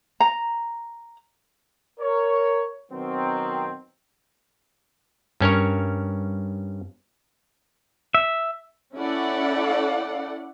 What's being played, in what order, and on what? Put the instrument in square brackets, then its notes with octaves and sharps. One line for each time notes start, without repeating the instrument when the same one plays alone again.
[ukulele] A#5
[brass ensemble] A#4 C#5
B2 D#3 F#3 B3 C4
[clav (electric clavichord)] G2 C#4 A#4 C#5
[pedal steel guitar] E5
[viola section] C#4 E4 A4 D5 F#5